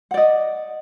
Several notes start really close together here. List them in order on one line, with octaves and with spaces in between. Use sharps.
F#5 D5 D#5